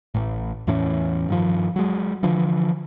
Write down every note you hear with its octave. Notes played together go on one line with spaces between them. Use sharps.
A1 A2
E2 A2 E3 C#4
G2 D#3 F3
F#3 G#3
D3 E3 F3